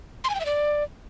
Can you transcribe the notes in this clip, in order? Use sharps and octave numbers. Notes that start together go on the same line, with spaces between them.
C6
G#5
G5
E5
D5